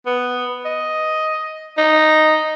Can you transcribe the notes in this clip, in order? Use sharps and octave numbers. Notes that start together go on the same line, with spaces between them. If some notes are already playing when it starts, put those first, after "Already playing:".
B3
D#5
D#4